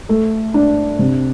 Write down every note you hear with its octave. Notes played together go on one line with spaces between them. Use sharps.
A3
D4
C3